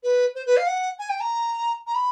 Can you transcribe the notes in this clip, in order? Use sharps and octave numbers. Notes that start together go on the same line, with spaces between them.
B4
C5
B4
F5
F#5
G#5
G5
A#5
A#5
B5